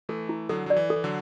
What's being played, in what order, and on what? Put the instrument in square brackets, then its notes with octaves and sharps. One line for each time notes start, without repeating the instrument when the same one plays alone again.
[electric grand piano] E3 A3 [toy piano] A4
[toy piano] E4
[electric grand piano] D3 F#3 [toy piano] A4
[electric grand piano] F#3 [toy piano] D5
[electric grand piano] E3
[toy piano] A4
[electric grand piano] E3
D3 F#3